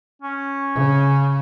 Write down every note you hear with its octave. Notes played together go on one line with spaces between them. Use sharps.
C#4
C#3